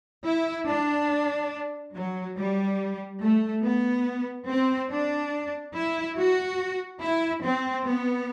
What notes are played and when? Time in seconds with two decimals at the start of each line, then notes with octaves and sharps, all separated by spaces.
0.26 E4
0.67 D4
1.95 F#3
2.37 G3
3.21 A3
3.63 B3
4.48 C4
4.90 D4
5.74 E4
6.16 F#4
7.01 E4
7.43 C4
7.85 B3